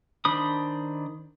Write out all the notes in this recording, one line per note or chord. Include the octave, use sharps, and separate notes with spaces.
D#3 D4 C5 B5 D#6